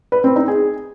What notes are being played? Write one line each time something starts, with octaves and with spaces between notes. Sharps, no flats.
B4
C4
D#4
G#4